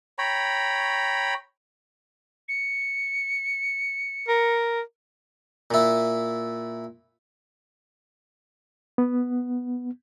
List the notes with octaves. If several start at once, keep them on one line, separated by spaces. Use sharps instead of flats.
C#5 G5 A#5 B5
C#7
A#4
A#2 E4
B3